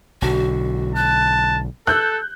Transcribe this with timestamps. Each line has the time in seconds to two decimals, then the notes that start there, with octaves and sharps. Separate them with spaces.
0.22 B1 D3 F#4
0.95 A5 F#6
1.87 A4 E6 F#6 G6